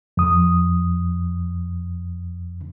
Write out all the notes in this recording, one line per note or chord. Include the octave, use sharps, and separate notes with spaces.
F2 D#6